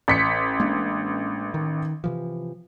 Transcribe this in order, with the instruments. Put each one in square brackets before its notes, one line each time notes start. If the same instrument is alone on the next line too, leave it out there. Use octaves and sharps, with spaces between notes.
[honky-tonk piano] A1 B6 C#7
[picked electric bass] G#3 A#3 D4
D#3
C3 E3 F3